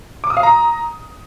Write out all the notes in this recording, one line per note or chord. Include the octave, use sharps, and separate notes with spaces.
D6
D#6
F5
A#5